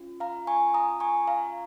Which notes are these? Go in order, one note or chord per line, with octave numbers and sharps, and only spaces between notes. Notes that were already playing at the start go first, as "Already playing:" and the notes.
Already playing: C#4 F4
F5 A#5
G#5 C#6
A#5 D#6
G#5 C#6
F5 A#5